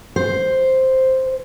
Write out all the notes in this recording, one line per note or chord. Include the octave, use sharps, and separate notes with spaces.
C5